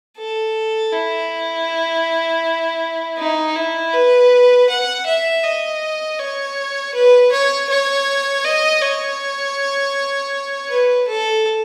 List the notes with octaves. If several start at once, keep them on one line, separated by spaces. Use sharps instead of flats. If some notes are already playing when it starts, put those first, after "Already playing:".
A4
E4
D#4
E4
B4
F#5
E5
D#5
C#5
B4
C#5
C#5
D#5
C#5
B4
A4